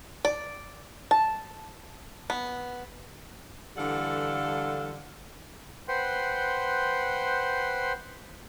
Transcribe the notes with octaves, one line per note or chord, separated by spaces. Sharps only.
D5
A5
B3
D3 E3 G3 A4 F5 F#5
B4 C5 F#5 G5 C6